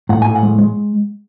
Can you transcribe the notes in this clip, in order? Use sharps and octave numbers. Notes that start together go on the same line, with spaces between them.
A2 F#5
A2 G#5
F#5
G#3
G#3